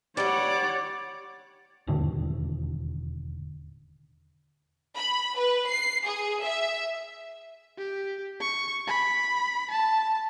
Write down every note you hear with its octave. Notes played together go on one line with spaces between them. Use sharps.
G2 G3 C#5 D5 F#5
E1 D#2 A2 D3
B5
B4
C7
G#4
E5
G4
C#6
B5
A5